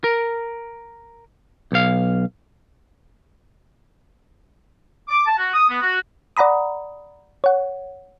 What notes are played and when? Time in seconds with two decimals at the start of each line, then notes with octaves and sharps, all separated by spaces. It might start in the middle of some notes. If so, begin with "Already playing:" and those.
0.04 A#4
1.72 B1 F5
5.08 D6
5.26 A5
5.37 F#4
5.54 D#6
5.69 B3
5.82 F#4
6.37 D5 F#5 A#5 B5 D#6
7.44 C#5 F#5